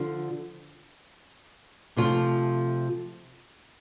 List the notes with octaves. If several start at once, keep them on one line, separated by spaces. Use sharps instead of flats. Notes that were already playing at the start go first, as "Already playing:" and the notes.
Already playing: D3 F3 D4 F4
C3 F3 A3 F4